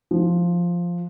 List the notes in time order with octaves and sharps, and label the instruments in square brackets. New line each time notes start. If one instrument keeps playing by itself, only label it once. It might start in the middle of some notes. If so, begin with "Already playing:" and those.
[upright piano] F3